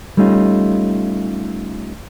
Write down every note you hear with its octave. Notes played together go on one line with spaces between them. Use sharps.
G3 A3 C#4 D#4 F4